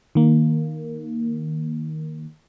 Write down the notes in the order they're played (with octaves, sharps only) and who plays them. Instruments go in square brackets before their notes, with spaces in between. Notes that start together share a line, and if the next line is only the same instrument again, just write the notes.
[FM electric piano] D#3 A#3